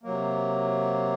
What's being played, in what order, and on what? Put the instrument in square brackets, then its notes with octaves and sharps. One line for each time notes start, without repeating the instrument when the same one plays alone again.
[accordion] C3 F#3 A#3